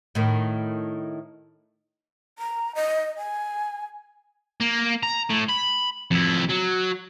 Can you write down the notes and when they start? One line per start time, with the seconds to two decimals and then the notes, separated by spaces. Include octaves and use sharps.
0.15 A2 D#3
2.39 A#5
2.75 D#5
3.18 G#5
4.61 A#3
5.03 A#5
5.30 A2
5.49 B5
6.11 F2 E4
6.50 F#3